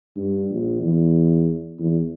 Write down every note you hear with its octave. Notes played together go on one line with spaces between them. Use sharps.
G2
A#1
E2
E2